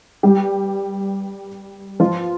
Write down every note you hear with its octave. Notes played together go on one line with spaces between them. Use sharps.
G3 G4
F3 F4